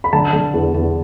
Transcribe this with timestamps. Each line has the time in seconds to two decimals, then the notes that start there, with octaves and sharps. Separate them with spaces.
0.04 B5
0.13 D3 A5
0.33 D3
0.54 E2
0.74 E2